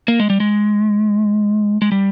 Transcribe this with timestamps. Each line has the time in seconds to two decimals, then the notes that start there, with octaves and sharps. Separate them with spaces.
0.08 A#3
0.20 G#3
0.30 G3
0.40 G#3
1.82 G#3
1.92 G3